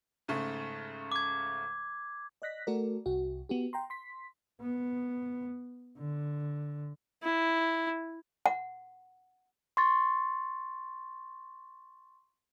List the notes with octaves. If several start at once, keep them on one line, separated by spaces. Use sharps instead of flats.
G#2 C#3 A3
D6 G#6
D5 D#5 F#6 A#6 B6
A3 F#4 A4 A#4 D5
C2 F#4
B3 F#4 G4
G5 A#5 C6
C6 B6
B3
D3
E4
F#5
C6 C#6 A6